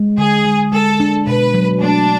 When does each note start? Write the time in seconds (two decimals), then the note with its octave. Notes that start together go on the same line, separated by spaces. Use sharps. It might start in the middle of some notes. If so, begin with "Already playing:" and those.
Already playing: G#3
0.18 D3 G#4
0.45 G#3
0.72 G#3 A4
1.00 D4
1.27 B2 B4
1.54 F#3
1.81 A3 D4